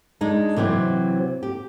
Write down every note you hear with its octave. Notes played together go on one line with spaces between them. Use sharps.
G#3 D4 D#4
C3 E3 F#3 C4
G4